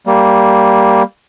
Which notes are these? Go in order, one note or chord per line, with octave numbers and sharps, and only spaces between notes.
G3 A#3